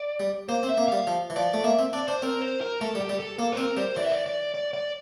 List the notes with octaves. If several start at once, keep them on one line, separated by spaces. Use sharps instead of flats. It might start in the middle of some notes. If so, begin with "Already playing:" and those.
Already playing: D5
G3
A#3 C5
C4
E5
A#3
G3 F5
F3
E3
F3 D5
A3
A#3 E5
C4
D4 D5
D4 C5
C4 A#4
C5
A#4
A3 A4
G3
G4
G3
A4
A#3 A4
C5
C4 A#4
G3 C5
E3 D5
E5
D5
D5
D5
D5